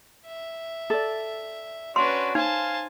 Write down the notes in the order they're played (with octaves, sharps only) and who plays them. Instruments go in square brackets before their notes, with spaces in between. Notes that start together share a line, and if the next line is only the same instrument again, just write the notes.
[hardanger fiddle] E5
[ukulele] A4 D5
[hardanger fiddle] C#4 B4 [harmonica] D4 F#4 [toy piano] C6
[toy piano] D#4 [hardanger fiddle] C5 A5 [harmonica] F5 G#5